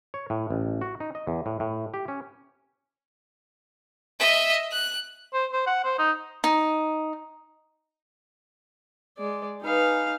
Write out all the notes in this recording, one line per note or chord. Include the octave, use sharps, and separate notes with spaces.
C#5
A2
A1
F#4
D#4
D#5
E2
A2
A2
G4
C#4
D#5 E5
F#6
C5
C5
F#5
C5
D#4
D#4
G#3 D5
D#4 G#4 B4 F5